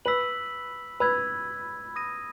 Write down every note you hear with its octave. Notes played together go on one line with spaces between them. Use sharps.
B4 E6 B6 F#7
B4 B5 E6 G#6
D#6 A#6 D#7